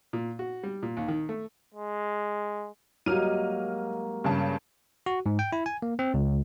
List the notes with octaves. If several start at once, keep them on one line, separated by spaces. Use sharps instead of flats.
A#2
F#4
G3
A#2
D#2
D#3
A3
G#3
G#2 F#3 G3 A#3 F6 D#7
G2 C#3 A5
F#4
G#2
G5
E4
G#5
A#3
C4
C#2